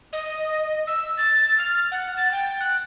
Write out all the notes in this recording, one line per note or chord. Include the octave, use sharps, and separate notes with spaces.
D#5
E6
A6
F6
F#5
A6
G5
F#6